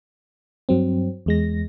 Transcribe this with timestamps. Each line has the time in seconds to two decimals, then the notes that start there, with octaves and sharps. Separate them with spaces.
0.69 G2 F#3 C4
1.26 E2 G#3 A#6